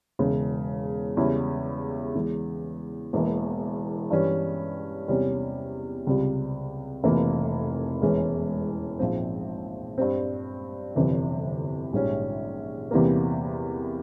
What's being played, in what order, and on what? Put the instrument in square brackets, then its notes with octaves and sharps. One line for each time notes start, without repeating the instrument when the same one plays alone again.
[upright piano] E1 E2 C#3
E2 C#3 G3 C#4 E4
E2 E3 G#3
E1 E2 E3 A#3
G2 E3 G3 C#4
E2 C3 G3 C#4
C#2 C3 G3
F1 F2 C3 E3 A#3
E1 E2 E3 G#3 C#4
A#1 G#2 F3 C4
G2 G3 C4
G1 F2 C3 E3
A#1 G#2 G3 C#4
E2 C3 E3 G3 A#3